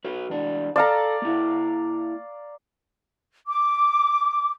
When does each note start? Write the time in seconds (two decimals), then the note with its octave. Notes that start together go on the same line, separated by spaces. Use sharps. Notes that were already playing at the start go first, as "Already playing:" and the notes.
0.04 F#4 B4 C#5
0.30 E2 D4
0.76 A4 D5 F5 A5 A#5
1.22 A#3 E4
3.48 D6